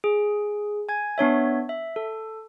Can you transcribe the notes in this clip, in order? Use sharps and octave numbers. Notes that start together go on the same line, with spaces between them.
G#4
G#5 G#6
B3 D4 C#5 E5
E5
A4